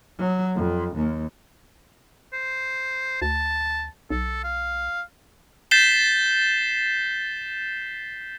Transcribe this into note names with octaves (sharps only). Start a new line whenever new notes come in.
F#3
F2
D#2
C5
D2 A5
B1 A4
F5
G6 A6 B6 C7 E7 G7